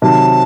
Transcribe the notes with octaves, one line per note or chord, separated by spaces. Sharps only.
C3 D#3 F#3 A5